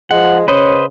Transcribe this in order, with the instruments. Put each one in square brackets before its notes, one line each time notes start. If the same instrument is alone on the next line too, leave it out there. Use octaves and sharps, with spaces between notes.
[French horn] F3 [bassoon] G#3 [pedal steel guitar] F#5
[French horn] C#3 [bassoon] C#4 [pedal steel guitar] B4 C5 D#5